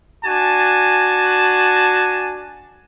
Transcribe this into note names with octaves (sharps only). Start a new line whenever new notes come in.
D4 F#4 G#5 A5